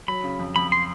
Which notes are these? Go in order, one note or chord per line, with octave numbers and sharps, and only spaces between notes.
F#3 B5
C#3
F2
F2 B5
C6